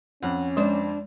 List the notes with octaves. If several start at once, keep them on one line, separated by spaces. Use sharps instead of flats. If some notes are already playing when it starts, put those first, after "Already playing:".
F2 C4 C#4 F#5
G#3 D4 C5